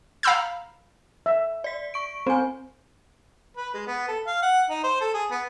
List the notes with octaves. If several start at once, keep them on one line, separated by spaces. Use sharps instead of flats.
F5 A#5 B5 E6 G6
E5
D5 B6
C#6 D7
C4 C5 G#5
B4
G#3
B3
A4
F5
F#5
D#4
C5
A4
G#4
B3